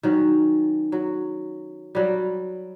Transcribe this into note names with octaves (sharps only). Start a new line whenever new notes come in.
D#3 F#3 C#4
F#3
F#3 G3